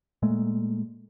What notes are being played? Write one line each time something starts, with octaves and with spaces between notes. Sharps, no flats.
A#2 G#3 A3